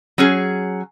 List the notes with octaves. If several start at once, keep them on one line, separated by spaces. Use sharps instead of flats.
F#3 C#4 G#4